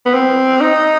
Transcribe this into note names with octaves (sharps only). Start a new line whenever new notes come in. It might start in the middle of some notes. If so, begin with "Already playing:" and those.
B3
C4
D#4